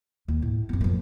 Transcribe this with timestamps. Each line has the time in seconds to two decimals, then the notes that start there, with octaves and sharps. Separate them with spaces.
0.28 D#2
0.42 A2
0.69 F#2 B3
0.81 F3 A#3